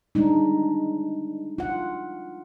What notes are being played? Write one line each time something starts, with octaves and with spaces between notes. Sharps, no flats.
G3 G#3 D4 D#4
F4 F#5